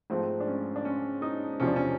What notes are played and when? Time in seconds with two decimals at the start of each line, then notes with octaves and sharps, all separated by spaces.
0.10 G#2 F3 A3 C4
0.40 D4
0.48 C#4
0.76 D4
0.85 C#4
1.22 D#4
1.59 E2 C3 F3 C#4
1.67 D4
1.76 C#4